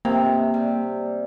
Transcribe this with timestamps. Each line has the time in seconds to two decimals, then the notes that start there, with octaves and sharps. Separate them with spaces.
0.05 C3 A#3 D#4
0.54 G3